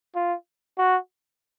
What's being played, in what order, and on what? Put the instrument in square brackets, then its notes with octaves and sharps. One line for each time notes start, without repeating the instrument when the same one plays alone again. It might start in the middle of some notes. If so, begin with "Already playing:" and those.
[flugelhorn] F4
F#4